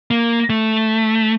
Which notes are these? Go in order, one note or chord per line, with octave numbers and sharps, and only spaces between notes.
A#3
A3